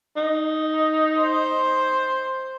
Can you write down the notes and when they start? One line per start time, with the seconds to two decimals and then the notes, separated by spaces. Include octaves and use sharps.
0.16 D#4
1.21 C5